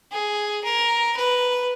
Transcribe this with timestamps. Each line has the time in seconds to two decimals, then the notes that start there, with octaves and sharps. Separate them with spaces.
0.12 G#4
0.64 A#4
1.17 B4